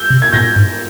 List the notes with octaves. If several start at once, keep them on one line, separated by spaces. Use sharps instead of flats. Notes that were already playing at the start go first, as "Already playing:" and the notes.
Already playing: E6 G6
C3
G#6
A#2 G6 A#6
G#2